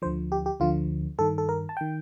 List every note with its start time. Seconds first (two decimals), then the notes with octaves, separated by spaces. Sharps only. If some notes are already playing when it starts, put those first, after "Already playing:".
0.02 D2 D3 F3 C5
0.32 G4
0.46 G4
0.60 D2 D3 F3 F4
1.18 G2 D#3 A4
1.38 A4
1.49 A#4
1.69 A5
1.77 D#3 G5